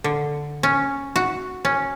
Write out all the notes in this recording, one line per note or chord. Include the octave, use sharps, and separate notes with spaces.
D3
C#4
F#4
C#4